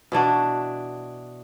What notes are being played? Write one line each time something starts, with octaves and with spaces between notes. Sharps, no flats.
B2 E3 D4 F#4